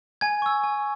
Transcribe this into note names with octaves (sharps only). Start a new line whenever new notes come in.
G#5 G#6
C#6 E6
G#5